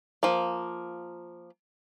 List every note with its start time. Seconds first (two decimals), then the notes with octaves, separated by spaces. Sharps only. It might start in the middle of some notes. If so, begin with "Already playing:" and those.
0.23 F3 A#3